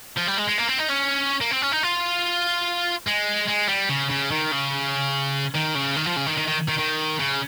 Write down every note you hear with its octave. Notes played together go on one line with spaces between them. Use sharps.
F3
G3
G#3
G#3
A#3
C4
D#4
C#4
A#3
C4
C#4
D#4
F4
G#3
G#3
G3
C#3
C#3
D#3
C#3
D#3
C#3
D#3
F3
C#3
D#3
D#3
D#3
D#3
D#3
C#3